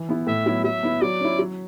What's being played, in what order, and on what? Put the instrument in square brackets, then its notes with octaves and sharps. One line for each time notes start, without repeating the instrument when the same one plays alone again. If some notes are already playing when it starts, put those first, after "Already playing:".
Already playing: [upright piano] E3
B3 E4
[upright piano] A2 [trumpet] E5
[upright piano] F#3 B3 E4
[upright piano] F#3 [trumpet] E5
[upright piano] B3 E4
[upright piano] F#3 [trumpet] D5
[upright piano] C#4 E4
F#3